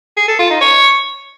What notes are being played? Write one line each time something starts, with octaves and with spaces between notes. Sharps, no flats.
G#4
A4
F4
D#4
C#5